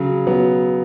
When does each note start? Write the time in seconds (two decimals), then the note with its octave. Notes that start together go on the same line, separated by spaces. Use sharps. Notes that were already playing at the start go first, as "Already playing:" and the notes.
Already playing: C#3 F#3
0.27 F#3 B3